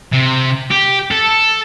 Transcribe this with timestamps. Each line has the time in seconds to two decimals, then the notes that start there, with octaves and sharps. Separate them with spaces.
0.13 C3
0.71 G4
1.11 A4